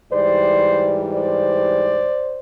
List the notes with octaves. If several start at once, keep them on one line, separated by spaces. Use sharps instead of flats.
G#2 E3 G3 C5 D5
C5 D5